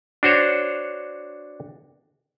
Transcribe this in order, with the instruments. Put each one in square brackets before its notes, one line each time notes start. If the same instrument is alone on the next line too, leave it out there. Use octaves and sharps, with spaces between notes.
[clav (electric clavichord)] D4 F#4 C5 C#5